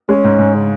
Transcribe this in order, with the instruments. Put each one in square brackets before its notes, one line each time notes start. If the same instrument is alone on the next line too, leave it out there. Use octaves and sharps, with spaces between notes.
[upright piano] G#3 [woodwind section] C#4
[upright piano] G#2
G#2
[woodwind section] C#3